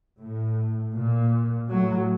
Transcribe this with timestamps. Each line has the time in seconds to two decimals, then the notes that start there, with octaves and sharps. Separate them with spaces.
0.20 A2
0.95 A#2
1.70 A2 F#3